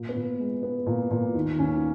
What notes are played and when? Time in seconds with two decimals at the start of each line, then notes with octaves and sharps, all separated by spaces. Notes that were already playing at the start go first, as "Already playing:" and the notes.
Already playing: A#2
0.09 B3
0.16 A#2
0.39 G#3
0.63 B3
0.86 A#2
1.11 A#2
1.35 D#2
1.58 D#2 C#4